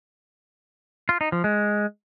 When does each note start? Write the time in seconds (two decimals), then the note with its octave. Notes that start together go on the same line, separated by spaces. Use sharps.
1.09 F4
1.21 D#4
1.32 F3
1.44 G#3